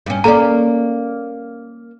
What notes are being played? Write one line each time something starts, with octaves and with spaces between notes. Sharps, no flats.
G2 C#4
A#3 C#4 A4 D5 A#5